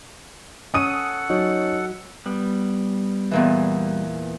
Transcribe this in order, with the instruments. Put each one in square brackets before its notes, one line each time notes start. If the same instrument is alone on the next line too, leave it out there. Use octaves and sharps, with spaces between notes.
[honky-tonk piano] C#4 D#6 D#7 [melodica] A4 F#5
[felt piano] F#3 [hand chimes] D#4 C#5 D#5
[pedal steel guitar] G3 B3
[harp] E2 A#2 E3